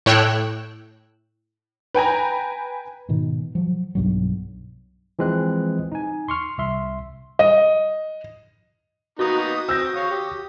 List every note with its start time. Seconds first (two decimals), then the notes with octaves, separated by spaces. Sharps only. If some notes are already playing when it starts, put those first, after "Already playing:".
0.06 A2 C#5 G5 E6 F#6
1.95 B4 G5 G#5 A#5
3.09 G#2 B2 D#3
3.55 F3 F#3
3.95 B1 G2 F#3
5.19 E3 F3 G#3 C4 F#6
5.92 D#4 G#5
6.28 C6 C#6 F6
6.58 C2 E5 C6
7.39 D#5
9.19 A#3 B3 D#4 F#4 D#6
9.69 C4 E6 G6 A#6
9.95 C#5 F5
10.11 G4